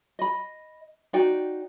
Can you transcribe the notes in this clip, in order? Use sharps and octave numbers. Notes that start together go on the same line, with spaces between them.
D#5 B5
D#4 F#4 D5 G5